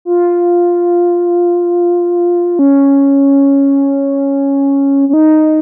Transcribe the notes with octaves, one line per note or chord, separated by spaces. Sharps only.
F4
C#4
C#4
D#4